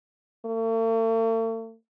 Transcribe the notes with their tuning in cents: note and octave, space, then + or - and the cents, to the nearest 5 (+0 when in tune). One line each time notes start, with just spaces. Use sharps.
A3 +45